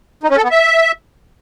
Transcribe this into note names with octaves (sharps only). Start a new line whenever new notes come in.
D#4
C#4
A4
B3
E5